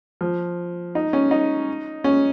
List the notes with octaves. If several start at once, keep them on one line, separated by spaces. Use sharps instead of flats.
F3
D#4
C#4
D#4
C#4